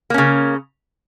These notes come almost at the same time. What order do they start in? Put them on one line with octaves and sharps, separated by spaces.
A#3 C#4 C#3